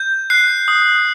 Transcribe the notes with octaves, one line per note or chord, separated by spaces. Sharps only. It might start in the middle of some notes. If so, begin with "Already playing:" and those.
Already playing: G6
F#6 C7
D#6